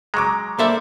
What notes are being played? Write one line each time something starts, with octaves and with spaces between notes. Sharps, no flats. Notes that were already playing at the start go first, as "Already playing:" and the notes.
F#3 G#3 A#5 C#6 D6
A#3 A4 C5 D5 E5 B5